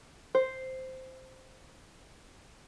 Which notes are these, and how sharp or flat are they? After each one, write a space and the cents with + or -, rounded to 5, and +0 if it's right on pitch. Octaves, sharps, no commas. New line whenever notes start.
C5 -5